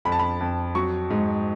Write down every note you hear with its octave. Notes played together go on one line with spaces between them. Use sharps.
F2 B5
A5
B5
F2
F#3 C#6
G#2